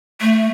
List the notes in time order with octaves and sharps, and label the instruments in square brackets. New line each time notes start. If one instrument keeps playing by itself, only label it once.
[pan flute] A3